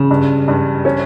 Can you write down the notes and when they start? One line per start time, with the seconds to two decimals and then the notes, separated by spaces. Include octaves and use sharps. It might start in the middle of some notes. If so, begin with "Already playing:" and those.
Already playing: C#3
0.11 G2
0.48 G2
0.85 C#4